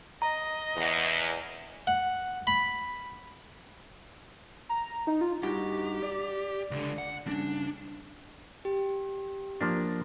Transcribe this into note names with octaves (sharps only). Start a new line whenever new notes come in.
D#5 A#5
E2
F#5
B5
A#5
D#4
F4
G2 D#4 F#4 G4
D5
C#2 D3
F#5
G2 C#3 D4
G4
F3 A#3 D4